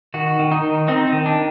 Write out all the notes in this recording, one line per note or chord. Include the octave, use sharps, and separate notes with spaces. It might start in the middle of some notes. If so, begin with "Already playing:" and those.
D#3 F#4
D#3
D#4
D#3
C4 D#4
D#4
D#3
D4